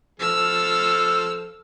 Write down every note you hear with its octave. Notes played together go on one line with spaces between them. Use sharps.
F3 A4 E6 F6